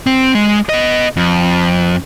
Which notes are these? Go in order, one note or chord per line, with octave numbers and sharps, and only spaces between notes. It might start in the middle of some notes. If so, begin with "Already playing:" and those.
C4
G#3
B3 D#5
F2